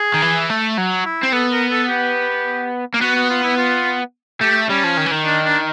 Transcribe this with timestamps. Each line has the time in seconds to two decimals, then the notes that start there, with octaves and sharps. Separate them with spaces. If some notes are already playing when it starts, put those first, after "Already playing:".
Already playing: G#4
0.14 D#3
0.22 E3
0.49 A3
0.77 F#3
1.05 E4
1.23 C4
1.33 B3 A4
1.52 A#4
1.71 A4
1.89 G4
2.94 A#3
3.01 B3 F#4
3.16 F#4
3.30 F4
3.43 E4
3.57 F4
4.41 A3 G4
4.69 G3 C#4
4.84 F3
4.97 D#3
5.06 E3
5.11 D#3
5.26 D4
5.44 D4